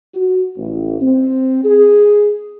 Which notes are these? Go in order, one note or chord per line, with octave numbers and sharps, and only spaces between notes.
F#4
A1
C4
G#4